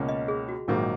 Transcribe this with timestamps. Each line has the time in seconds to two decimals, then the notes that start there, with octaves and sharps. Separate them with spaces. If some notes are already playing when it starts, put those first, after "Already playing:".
Already playing: C#2 B2 A#3 C#4
0.09 D#5
0.28 G#4
0.49 F#4
0.68 A#1 G#2 D#3 F#3 A#3 F4